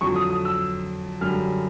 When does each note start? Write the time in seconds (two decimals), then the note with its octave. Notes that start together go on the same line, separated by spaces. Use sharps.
0.01 F2 D3 F#3 C#6
0.16 D#6
0.30 D#6
0.45 E6
1.21 F#2 D3 G3 F6